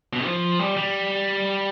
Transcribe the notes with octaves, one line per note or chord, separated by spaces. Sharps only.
B2
F3
G3
G3